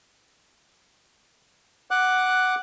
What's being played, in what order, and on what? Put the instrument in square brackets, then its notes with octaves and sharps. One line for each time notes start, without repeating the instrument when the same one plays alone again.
[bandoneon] F#5 D6 F#6